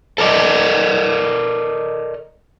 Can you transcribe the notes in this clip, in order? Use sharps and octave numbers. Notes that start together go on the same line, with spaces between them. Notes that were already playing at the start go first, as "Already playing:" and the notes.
A4 A#4 D5 D#5